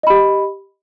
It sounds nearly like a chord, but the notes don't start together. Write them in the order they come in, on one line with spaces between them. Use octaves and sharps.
D#5 B5 G4